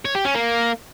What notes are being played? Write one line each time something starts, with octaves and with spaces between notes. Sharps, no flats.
C#5
G4
C#4
A#3